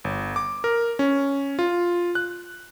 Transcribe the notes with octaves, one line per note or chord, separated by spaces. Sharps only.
G1
D6
A#4
C#4
F4
F#6